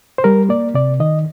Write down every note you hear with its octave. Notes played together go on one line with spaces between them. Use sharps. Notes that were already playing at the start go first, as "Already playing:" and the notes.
C5
G3 A#4
A#3 D5
C3 D5
D#3 D#5